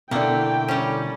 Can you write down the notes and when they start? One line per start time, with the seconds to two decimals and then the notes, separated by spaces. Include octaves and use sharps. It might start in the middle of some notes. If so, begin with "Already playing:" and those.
0.11 B2 D3 A3 A#3 E4 G5
0.68 G3 C#4